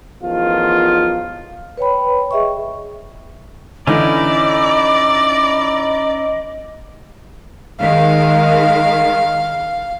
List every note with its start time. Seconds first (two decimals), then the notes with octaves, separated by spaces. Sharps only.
0.23 A1 E2 D#3 F3 F4
1.77 B4 C#5 G5 B5
2.31 G#4 D#5 E5 G5 C#6
3.87 D3 E3 C#4 D#4 E4 D5 D#5
7.80 D#3 G#3 F5